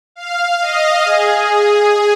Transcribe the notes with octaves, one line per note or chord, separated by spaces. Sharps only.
F5
D#5
G#4